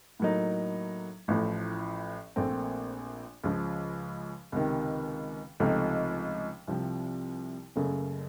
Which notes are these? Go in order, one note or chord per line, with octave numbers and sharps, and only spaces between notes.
A2 F#3 A#3 D#4
A1 A2 F3
A#1 A#2 A3 C4
C#2 C#3 F3
C#2 C3 D#3
C#2 C3 F3 A3 D#4
C2 C3 F3
F#1 F#2 C#3 A3